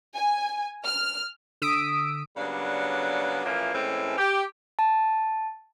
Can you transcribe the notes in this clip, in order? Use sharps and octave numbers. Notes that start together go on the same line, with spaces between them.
G#5
F6
D3 D#6 E6 B6 D7
C#3 F#3 G3 A#3 B3 D4
A#2 E3 F3 A3 A#3 C#4
A2 E3 G#3 A3 C4 C#4
G4
A5